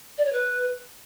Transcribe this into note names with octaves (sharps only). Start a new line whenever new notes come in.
D5
C#5
B4